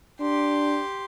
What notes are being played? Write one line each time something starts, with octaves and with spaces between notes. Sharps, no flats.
D4 G4 C6